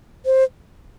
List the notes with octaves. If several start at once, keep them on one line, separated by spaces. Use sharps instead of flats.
C5